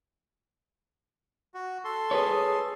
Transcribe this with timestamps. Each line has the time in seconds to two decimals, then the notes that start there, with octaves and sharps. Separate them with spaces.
1.54 F#4
1.84 A4 C6
2.11 G#4 B4 C#5